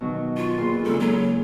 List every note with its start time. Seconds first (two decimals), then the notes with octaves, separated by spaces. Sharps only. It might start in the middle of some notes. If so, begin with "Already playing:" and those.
0.01 B2 D#3 F#3
0.37 F4 C#6
0.58 E2 A#2 C6
0.85 C#3 G#3 A#3 A4
1.00 F#3 A#3 B5